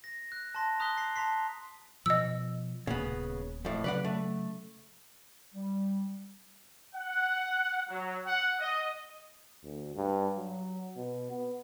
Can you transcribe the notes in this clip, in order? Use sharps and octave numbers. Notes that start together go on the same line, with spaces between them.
A#6
F#6
A5 C6 A#6
A#5 D#6 F#6 B6 G7
A#6 C7
A5 A#5 C6 B6 C7
B2 F3 D#5 E6
D#1 A#2 C#3 B3
F2 A2
C#3 F#3 B4 D5 F#5
A3
G3
F#5
F#3
F#5
D#5
D2
G2
F#3
B2
B3